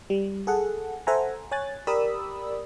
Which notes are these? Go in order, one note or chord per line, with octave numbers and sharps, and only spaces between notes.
G3
G#4 A4 F#5
A4 C5 E5 F#5 G#5 A#5
C#5 G#5 F#6 A6
G4 A#4 D5 B5 D#6 E6